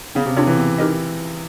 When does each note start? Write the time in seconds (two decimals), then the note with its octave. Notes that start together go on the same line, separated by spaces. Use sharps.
0.15 C#3 B3
0.26 C3
0.36 C3 D4 F4 A4 C#5
0.47 E3
0.57 B3
0.78 D#4 G4 A#4 D#5